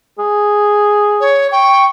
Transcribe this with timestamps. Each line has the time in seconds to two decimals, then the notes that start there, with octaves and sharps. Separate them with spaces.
0.19 G#4
1.21 C#5
1.52 G5 C#6